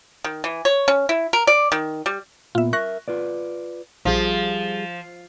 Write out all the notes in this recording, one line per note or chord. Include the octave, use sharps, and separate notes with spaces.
D#3
E3
C#5
C#4
E4
A#4
D5
D#3
G3
A#2 B3 F4 E5
A#4 E5 C#6 F#6 A#6
F4 B4 D5
A#1 F3 G3 G#4